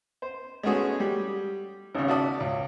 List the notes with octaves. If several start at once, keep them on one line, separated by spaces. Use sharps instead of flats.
C5
G#3 A3 B3 C#4 F#4 G#4
G3
G#1 C#3
F#4 D5 E5 A5 D#6
C#2